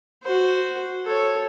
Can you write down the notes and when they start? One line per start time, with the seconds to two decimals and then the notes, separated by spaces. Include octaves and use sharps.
0.23 F#4 C5
1.06 A4 C#5